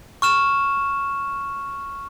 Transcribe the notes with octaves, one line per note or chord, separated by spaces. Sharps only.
C#6 F6 E7